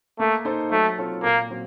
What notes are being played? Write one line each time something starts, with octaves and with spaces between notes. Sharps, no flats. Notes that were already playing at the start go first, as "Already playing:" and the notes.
A3 A#3
D#4 A4 C5
F#3 A3
C4 F4 A4 C#5
A#2 A#3
F#3 C4